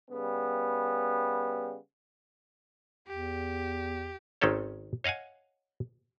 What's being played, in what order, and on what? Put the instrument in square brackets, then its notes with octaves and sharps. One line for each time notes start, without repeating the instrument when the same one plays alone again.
[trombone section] C#3 G3 B3
[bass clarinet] E2 [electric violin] G4
[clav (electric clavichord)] G#1 D#3 C4 C#4 A4 C#5
C#5 D#5 F5 F#5 G#5